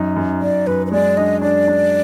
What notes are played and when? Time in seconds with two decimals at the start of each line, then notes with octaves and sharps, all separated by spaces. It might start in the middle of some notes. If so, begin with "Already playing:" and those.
Already playing: F#2 D#4
0.16 F#2
0.42 F#2 D5
0.67 F#2 B4
0.87 B4
0.92 G#3 D5
1.17 D4 D#5
1.41 D4 D5
1.68 D4